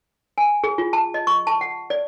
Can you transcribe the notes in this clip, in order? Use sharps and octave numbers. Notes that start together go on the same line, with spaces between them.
G#5
G#4
F4
A5
D#5
C#6
A5
F#5
D5